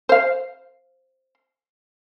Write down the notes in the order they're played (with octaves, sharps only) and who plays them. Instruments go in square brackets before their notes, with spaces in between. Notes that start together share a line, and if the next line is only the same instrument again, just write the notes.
[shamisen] C5 F5